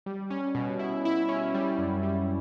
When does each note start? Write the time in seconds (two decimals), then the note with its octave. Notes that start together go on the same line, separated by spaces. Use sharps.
0.06 G3
0.30 C#4
0.55 B2
0.79 E4
1.05 E4
1.29 C#4
1.54 G3
1.78 F#2
2.03 G3